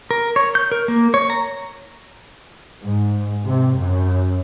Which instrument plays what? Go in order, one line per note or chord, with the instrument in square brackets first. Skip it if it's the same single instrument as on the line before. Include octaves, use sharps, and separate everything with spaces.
[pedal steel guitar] A#4
C#5
G6
A#4
A#3
C#5
A#5
[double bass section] G#2
C3
F#2